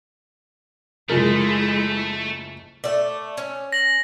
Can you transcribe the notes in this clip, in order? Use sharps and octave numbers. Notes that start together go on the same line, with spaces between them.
F#1 F3 G#3 A3 E4 A#4
A3 D5
C#4
A#6 F#7